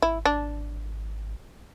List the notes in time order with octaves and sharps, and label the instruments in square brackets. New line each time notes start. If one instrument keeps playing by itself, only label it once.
[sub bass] G#1 [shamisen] E4
[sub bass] G#1 [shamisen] D4